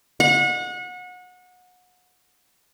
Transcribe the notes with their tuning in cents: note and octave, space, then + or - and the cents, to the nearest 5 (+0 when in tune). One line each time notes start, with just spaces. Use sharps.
F#5 -30